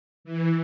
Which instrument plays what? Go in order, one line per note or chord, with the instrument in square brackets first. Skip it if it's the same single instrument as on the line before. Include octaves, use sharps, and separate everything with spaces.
[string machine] E3